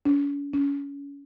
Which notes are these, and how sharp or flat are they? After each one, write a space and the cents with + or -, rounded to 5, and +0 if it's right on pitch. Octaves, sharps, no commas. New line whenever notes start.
C#4 +45
C#4 +25